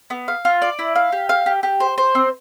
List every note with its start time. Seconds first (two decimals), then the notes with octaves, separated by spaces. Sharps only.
0.10 B3
0.28 F5
0.45 F4
0.62 D5
0.79 E4
0.96 F5
1.12 G4
1.29 F5
1.46 G4
1.63 G4
1.80 C5
1.98 C5
2.15 C4